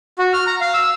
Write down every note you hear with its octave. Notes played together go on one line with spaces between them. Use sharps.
F#4
F6
A#5
F5
E6